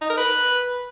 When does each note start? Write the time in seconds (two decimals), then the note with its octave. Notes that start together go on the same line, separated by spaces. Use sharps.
0.01 D#4
0.10 A#4
0.18 B4